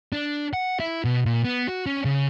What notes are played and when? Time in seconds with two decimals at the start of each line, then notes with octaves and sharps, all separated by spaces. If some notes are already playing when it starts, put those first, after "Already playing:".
0.13 D4
0.53 F#5
0.80 E4
1.04 B2
1.25 A#2
1.44 B3
1.68 F#4
1.86 C#4
2.05 C#3